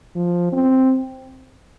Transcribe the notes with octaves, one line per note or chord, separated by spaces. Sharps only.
F3
C4